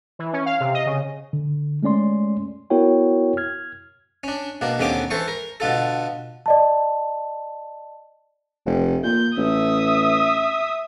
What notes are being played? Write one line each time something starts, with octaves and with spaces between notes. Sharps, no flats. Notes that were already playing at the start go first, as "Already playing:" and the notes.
E3
C#4
F5
C3
D#5
C#3
D3
G#3 A3 C#4 D5 C6
B3 E4 F#4 A#4 C#5 G5
F6 G#6
C#4 D4
B2 A#3 D4
D#2 D3 C4 C#4 G4 D6
E3 A4 C5 C#6
A#4
B2 D3 F4 A4
D5 D#5 A5
F1
A#2 G6
A1 E5 D#6